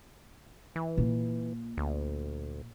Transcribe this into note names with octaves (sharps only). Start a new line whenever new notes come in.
E3
A#2
D2